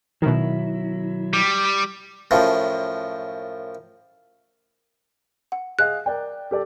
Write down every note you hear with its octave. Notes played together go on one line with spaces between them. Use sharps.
B2 D#3 F#3 E4
G3
F#2 A2 F3
F#5
G#4 D#5 F5 F#6
A#4 D5 G5
G4 A4 D5